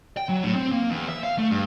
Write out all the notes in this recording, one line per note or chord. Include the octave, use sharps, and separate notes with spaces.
G5
F#3
A2
C4
A#3
E2
E5
F5
A3
G2